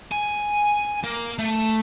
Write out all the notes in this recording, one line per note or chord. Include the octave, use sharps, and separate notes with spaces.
G#5
A#3
A3